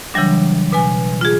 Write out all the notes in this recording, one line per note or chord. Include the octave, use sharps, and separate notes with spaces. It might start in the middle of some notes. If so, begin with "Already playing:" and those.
C#3 E3 F#3 G3 D4
B2 B4 G#5
F4 G#4